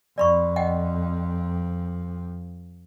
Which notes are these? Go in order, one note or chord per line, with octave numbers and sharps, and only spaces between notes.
F2 D5 B5 C#6
D#5 F#5 G5